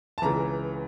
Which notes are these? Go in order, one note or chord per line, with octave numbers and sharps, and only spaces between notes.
A5
C#2 C#3 E3 A#5